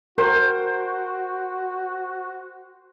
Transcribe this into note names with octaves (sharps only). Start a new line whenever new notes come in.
F#4 A#4 C5 G5